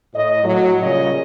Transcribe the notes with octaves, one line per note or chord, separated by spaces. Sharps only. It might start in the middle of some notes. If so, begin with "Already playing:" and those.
A2 D#5
A2 F#3
A#2 C#3 G3 C#5 D#5